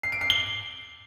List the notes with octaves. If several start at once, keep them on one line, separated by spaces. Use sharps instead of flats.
C7
D7
C7
G7